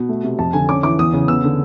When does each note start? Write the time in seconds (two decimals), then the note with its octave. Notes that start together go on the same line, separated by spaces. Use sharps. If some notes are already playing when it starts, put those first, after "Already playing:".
Already playing: B2
0.09 A3
0.23 C3
0.39 F2 A5
0.53 D3 G#5
0.69 C#4 D6
0.83 E3 D6
0.99 E2 D#6
1.14 C#3
1.28 B3 E6
1.44 D3